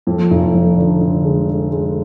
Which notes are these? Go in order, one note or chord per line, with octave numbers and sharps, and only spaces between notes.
F2
F1
F2
D3
D3
G#3
G#3
G#3